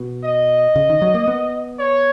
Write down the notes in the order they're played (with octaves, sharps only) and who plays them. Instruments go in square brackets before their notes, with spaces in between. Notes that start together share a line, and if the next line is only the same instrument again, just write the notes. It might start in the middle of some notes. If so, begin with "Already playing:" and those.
Already playing: [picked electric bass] B2
[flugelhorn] D#5
[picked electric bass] C#3
D#3
F#3
A#3
B3
[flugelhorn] C#5